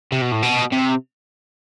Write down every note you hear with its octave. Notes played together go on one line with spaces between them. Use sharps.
C3
B2
A2
B2
C3